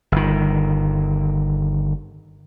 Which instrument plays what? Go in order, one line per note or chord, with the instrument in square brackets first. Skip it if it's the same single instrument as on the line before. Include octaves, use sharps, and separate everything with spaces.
[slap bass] G1 D#3